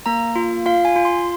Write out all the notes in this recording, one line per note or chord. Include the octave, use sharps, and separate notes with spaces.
A#3 A#5
F4
F4 F5
G#5
F4
C6